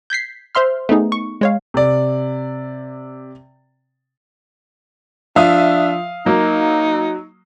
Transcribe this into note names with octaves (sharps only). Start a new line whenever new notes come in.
G6 G#6 B6 C7
C5 E5 C6 F6
A3 B3 D#4 G#4
C#6
G#3 C#5 F5
C3 D5
F3 D4 E5 F5 D#6
F#3 A#3 D#4